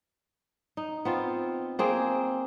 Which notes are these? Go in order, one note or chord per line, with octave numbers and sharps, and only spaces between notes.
D#4
B3 C4 F4
A#3 C4 G#4